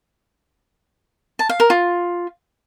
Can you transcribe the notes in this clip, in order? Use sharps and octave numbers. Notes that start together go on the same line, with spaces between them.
A5
F5
A#4
F4